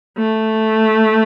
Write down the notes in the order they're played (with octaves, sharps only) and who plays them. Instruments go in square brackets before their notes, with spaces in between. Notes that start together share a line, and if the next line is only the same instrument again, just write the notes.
[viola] A3